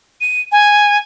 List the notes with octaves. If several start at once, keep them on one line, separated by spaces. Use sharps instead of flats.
D#7
G#5